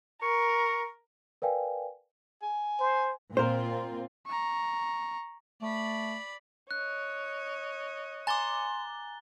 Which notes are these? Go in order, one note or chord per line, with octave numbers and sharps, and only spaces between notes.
A#4 C#6
A#4 B4 D5 F5 G5 G#5
G#5
C5
A#2 C4 F4 A#4 C5
A#5 C#6
A3 D5 B5
C#5 D#5 F#6
G#5 A#5 C6 D6 A6 G7